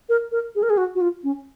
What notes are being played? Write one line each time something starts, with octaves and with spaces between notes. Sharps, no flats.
A#4
A#4
G#4
A#4
G#4
F#4
F#4
F4
C#4